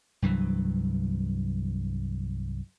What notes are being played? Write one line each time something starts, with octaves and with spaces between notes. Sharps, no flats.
C2 G2 E3 F#3